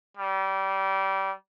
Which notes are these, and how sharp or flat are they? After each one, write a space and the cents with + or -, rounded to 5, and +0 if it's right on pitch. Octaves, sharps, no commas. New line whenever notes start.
G3 -25